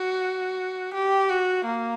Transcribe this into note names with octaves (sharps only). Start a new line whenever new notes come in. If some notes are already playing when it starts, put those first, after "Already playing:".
Already playing: F#4
G4
F#4
A#3